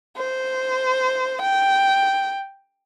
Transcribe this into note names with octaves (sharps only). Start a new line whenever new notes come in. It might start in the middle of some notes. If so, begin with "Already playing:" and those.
C5
G5